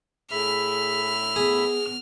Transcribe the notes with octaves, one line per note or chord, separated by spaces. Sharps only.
A2 G#4 E5 B5 F6
B3 G#4